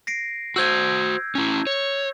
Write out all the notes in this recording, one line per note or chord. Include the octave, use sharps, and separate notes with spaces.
A#6 C7 D7
F#4 C5 E6 G6 G#6
C#4 E4
C#5